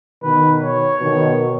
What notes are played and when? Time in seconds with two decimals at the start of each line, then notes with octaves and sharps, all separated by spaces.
0.23 B2 D#3 B4
0.62 C#5
1.01 B2 D#3